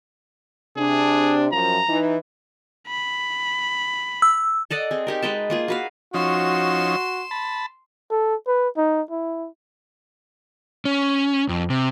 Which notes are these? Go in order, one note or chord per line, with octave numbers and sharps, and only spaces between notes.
C3 D4 G#4
F#2 F3 A#5
E3 D#4
B5
E6
A4 D5 D#5 F#5
C4 G#4
D#4 G4 A#4
G#3 B4 G5 A5
A#3 F4 G#4
F#4 B4 F5
F3 C#4 D#4 F#4 C6 E7
A5 B5
A4
B4
D#4
E4
C#4
F2
C3